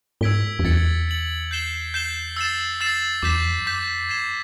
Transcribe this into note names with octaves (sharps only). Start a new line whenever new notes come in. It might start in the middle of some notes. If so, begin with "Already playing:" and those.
G#2 E6 G#6 B6 D7 G7
F2
E2 A6 C#7 F#7
A6 C#7 F#7
G6 C7 E7 G7
G6 C7 E7 G7
F2 E6 A6 C7 E7
E6 A6 C7 E7
E2 D6 G6 B6 E7
F2
G2
F#2 D6 G6 B6 E7
F2
G2 G#6 C7 E7 G7